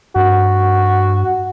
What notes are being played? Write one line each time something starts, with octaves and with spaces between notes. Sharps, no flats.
G2 F#4